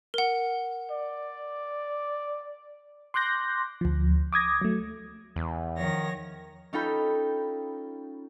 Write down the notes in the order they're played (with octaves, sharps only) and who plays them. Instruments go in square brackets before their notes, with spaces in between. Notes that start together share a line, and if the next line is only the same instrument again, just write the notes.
[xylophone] A#4 F#5
[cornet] D5
[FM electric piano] C6 D6 F#6 G6 A#6
D2 F3
D6 D#6 G#6 A#6
F#3 A3
[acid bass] E2
[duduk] D#3 [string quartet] F3 C#5 A#6
[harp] C#4 D#4 F4 A4 G5 B5